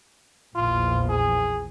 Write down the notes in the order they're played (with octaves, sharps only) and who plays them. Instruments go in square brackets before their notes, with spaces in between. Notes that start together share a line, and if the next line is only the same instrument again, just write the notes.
[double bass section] A#1 E2 F3 [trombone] F4
[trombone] G#4